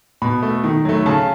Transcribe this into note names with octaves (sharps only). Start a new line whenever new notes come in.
B2 B5
A3
D#3
F#3 A3
C#3 A5